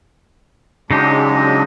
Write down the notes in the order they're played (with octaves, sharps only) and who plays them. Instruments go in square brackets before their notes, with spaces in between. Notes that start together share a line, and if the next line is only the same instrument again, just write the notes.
[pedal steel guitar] C#3 D#4 G4 [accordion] F#3 G#3 D4